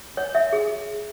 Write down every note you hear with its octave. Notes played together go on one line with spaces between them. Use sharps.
C#5
E5
G#4